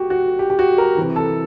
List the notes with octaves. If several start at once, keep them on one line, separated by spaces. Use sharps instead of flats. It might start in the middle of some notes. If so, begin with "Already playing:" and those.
Already playing: F#4 G4
F#4
G4
G4
F#4
A#4
C3 E3
A4